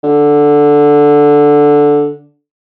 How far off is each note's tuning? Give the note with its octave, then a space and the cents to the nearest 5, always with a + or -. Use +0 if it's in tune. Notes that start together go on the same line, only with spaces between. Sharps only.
D3 +0